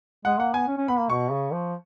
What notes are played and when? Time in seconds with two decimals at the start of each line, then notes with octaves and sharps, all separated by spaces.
0.25 G#3 F#5
0.39 A#3 F#5
0.54 B3 G#5
0.68 C#4
0.78 C#4
0.88 B3 B5
1.00 A#3
1.10 B2 C#6
1.32 C#3
1.53 F3